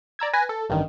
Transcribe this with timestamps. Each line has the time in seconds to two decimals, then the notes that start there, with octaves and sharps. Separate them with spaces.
0.19 D5 A#5 E6 G#6
0.33 B4 G#5 F#6 A#6
0.49 A4
0.69 A1 G2 D#3